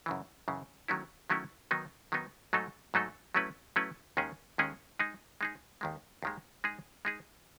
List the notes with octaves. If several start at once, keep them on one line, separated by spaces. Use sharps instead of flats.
F#2 C#3 E3
F#2 C#3 E3
D#3 F#3 A3 C#4 E4
D#3 F#3 A3 C#4 E4
D#3 F#3 B3 D#4
D#3 F#3 B3 D#4
G#2 F#3 A3 D#4 A4
G#2 F#3 A3 D#4 A4
F#3 A3 C#4 E4 B4
F#3 A3 C#4 E4 B4
D#2 D#3 G#3 C#4 G#4
D#2 D#3 G#3 C#4 G#4
G#3 D#4 G#4
G#3 D#4 G#4
D#2 D#3 G#3
D#2 D#3 G#3
G#3 D#4 G#4
G#3 D#4 G#4